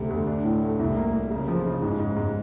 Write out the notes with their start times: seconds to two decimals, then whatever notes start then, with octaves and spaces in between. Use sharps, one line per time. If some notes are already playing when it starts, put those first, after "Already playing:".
Already playing: D2 C3
0.10 D2
0.27 D4
0.44 A2
0.61 A3
0.79 C2
0.96 A#3
1.14 A#3
1.31 C#3
1.48 F3
1.66 C#3
1.82 G#2
1.99 G#2
2.17 G#2